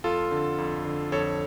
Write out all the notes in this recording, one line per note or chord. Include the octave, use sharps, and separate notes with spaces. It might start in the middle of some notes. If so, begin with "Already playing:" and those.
F2 F4 A4
D3
F2
D3
F2 A4 C#5